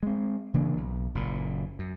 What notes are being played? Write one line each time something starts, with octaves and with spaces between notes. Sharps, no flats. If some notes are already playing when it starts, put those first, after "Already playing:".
G#3 C4
C#3 E3 A#3 D4
B1
F#1 A#2
F#2